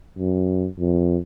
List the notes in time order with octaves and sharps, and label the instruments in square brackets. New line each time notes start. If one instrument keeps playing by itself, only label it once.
[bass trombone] F#2
F2